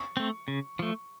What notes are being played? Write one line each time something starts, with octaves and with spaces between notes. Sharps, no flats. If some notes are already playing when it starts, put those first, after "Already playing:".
Already playing: C#6
A3 C4
C#3
F3 A3